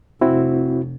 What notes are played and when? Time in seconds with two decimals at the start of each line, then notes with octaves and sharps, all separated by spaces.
0.21 F1 C4 E4 F#4